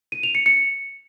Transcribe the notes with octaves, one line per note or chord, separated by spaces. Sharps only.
D#7
F7
C#7
C#7